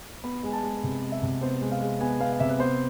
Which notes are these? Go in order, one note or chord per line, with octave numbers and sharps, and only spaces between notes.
B3 B5
G#3 G#5
A5
G#3
C3
G#3
E5
C3
B3 C5
G#3
F5
G#3
B3 G#5
B3 F5
F5
C3 E5
B4
B3 C5